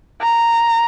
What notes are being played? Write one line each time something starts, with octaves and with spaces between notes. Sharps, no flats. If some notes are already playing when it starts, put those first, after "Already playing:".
A#5